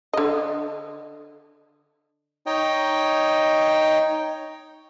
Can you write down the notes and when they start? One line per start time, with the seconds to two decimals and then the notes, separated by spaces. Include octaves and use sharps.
0.14 D3 D#5
2.46 D#4 C#5 D#5 G5